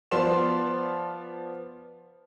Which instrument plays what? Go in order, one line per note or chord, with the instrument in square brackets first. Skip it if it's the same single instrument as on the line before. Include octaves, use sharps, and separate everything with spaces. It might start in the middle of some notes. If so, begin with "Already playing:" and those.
[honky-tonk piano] F3 B3 F4 D5 C6 E7